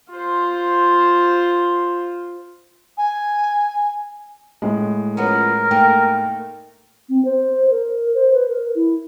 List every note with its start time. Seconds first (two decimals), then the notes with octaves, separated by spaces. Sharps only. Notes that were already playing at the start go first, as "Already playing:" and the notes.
0.13 F4 C5
2.98 G#5
4.62 A2 G#3
5.17 F3 B3 C#4 A#4
5.71 A3 A#3 D#4 G5
7.09 C4
7.25 C5
7.70 A#4
8.14 C5
8.34 B4
8.48 A#4
8.75 E4